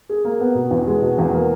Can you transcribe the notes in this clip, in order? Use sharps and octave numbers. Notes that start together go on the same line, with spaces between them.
G#4
A#3
B3
B2
E2
G#3
B2
E2
A#3